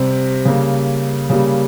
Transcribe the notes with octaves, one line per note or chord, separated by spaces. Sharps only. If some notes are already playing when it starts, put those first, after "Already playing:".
Already playing: C3 G3 C4
C#3 G3 A#3
C#3 G3 A#3